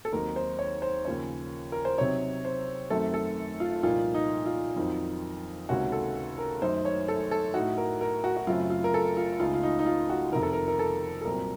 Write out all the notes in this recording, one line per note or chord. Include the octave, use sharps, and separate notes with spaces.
A4
D#2 D#3 F#3 C4 D#4 A#4
C5
C#5
C5
D#2 C#3 F3 A#3 C#4 C#5
A#4
C5
C3 F#3 C4 D#4 C#5
C5
F#2 D#3 F#3 A3 C4 A4
A4
F4
C2 A#2 F3 A#3 D#4 F4
D#4
F4
F2 D#3 F#3 C4 D#4
C#2 C3 D#3 A#3 C#4 F#4
A4
A#4
F#2 D#3 A3 D#4 C5
C#5
A4
A4
A2 A3 D#4 F#4
A#4
A#4
F#4
F#4
F#2 C#3 F#3 A3 C4 F4
F4
A#4
A4
F4
C#2 C#3 A3 D#4 F4
F4
D#4
D#4
F4
F#4
F2 C3 D#3 A#4
A4
A#4
A#4
A4
A4
C2 A#2 F#3 C4 A#4